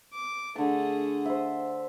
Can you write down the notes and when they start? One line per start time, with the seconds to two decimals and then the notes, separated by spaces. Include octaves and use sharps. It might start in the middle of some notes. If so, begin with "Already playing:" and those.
0.13 D6
0.56 D3 A3 G#4 A5
1.26 C5 E5